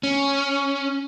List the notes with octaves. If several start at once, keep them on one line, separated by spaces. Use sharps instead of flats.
C#4